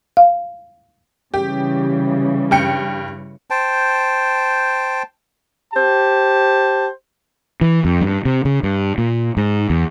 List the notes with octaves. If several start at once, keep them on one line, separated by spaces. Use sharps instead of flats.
F5
C#3 E3 G3 G4
G2 G5 C#7
C5 G5 A5
G4 C5 A5
E3
F2
G2
C3
C#3
G2
A#2
G#2
E2